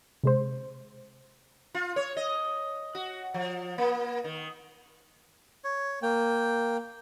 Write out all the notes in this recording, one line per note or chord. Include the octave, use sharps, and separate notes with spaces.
C3 G#3 C5
F4
C#5
D#5
F#4
F3
A#3
D#3
C#5
A#3 G5